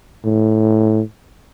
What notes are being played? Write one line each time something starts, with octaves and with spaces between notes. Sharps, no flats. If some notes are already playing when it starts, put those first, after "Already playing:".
A2